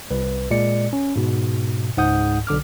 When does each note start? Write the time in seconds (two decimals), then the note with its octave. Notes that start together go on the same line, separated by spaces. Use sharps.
0.11 C2 B4
0.51 A#2 G#3 D5 C#7
0.93 C#4
1.16 G#2 B2
1.97 C#2 G#2 F#5 D#6 G6
2.47 B1 D3 D6 F6